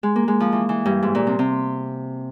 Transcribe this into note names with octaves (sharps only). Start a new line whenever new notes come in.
G#3
A#3
G#3
F3
E3
E3
G2
G#2
A#2
C3
C3